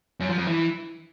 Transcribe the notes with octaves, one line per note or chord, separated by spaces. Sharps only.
F#2
F3
F2
E3